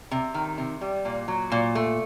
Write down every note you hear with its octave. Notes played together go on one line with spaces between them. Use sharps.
C3
D#3
C3
G3
A#2
F#3
A#2
A3